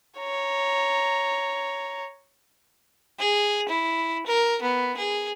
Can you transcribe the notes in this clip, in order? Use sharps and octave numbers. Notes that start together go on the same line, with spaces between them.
C#5 A#5
G#4
E4
A#4
B3
G#4